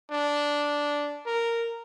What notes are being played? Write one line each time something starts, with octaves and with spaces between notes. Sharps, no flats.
D4
A#4